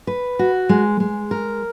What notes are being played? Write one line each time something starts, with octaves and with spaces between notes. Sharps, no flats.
B4
F#4
G#3
G#3
A#4